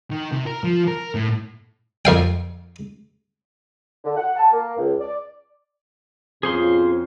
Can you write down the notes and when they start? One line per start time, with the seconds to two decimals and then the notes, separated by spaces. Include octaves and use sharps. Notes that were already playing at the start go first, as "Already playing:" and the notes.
0.11 D#3
0.32 C3
0.47 A#4
0.64 F3
0.88 A#4
1.15 A2
2.05 F2 F5 G5
4.04 D3
4.17 F#5
4.37 A5
4.52 A#3
4.78 C#2
5.00 D5
6.43 F2 B2 C#4 F4 G#4 C5 C6